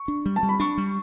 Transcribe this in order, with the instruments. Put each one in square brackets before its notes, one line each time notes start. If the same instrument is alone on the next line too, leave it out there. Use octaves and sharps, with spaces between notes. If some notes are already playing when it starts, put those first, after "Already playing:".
Already playing: [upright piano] C#6
[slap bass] D4
G3
[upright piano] A5
[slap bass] G3
[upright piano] B5
[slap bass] D4 [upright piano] C#6
[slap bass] G3